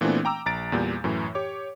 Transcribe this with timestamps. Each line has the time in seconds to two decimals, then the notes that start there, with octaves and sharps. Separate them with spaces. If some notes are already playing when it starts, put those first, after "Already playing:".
0.01 A#2 E3 A3 B3 C4 D4
0.25 G5 A#5 D6 E6
0.46 A#1 A#5 A6 D7
0.72 E2 A#2 G3 G6
1.04 F#2 A2 E3
1.35 G4 C#5 D6